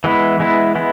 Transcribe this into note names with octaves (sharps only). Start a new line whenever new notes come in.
E3 G#3 B3 E4
E3 G#3 B3 E4
G#3 B3 E4